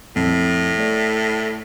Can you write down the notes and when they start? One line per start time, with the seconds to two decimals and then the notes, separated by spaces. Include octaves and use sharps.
0.16 F2 A2
0.78 A3 D5